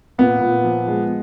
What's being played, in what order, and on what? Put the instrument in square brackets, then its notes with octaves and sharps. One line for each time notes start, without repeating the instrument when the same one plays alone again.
[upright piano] A#2 [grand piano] B3
[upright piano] A#2
F3
G#3